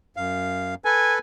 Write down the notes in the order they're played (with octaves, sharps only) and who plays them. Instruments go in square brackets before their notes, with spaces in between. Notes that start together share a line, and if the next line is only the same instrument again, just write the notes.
[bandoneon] F#2 F5
[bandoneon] A4 B4 [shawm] G#5